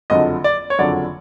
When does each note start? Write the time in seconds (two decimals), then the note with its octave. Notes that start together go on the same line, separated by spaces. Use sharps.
0.10 F#1 F2 D3 F#3 D#5
0.44 D5
0.70 C#5
0.79 F#1 F2 D3 F#3 D5